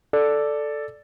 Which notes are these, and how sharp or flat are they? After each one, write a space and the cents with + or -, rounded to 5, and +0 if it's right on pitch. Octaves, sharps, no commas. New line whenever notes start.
A4 +0 D5 +0